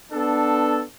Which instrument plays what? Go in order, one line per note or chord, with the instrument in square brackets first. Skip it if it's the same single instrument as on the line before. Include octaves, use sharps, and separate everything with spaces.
[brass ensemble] B3 D4 A4